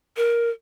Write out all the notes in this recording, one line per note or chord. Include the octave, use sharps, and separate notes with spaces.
A#4